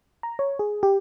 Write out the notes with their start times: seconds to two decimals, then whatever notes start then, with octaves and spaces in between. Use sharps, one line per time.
0.23 A#5
0.39 C#5
0.59 G#4
0.83 G4